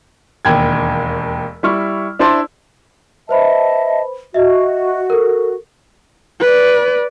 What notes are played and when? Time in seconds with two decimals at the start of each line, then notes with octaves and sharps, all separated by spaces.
0.45 E1 D#2 G5 G#6
1.63 G3 E4 C#6 F6
2.19 D4 E4 C5 D5 A5 C6
3.29 B4 C5 D#5 E5 A5 B5
4.34 F#4 D#5 E5
5.10 A4 A#4
6.40 B4 D5